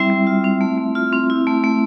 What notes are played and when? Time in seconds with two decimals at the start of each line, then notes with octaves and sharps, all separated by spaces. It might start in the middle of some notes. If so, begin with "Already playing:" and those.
Already playing: G3 C4 E4 E5
0.10 G3
0.27 F4
0.44 C4
0.61 A3
0.78 A3
0.95 F4
1.13 C4
1.30 E4
1.47 A3
1.64 A3